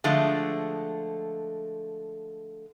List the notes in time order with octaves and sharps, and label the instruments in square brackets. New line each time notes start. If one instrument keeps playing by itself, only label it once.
[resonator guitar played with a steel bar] D3 F3 G#3 A3